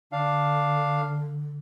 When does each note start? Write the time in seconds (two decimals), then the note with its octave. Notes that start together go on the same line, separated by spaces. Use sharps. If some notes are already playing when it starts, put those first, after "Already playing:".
0.12 D3 D4 F5